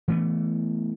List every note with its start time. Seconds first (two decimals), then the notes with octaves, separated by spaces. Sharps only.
0.08 E3 A3 B3